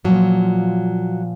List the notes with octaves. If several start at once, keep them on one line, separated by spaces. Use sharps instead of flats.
A#2 F3 F#3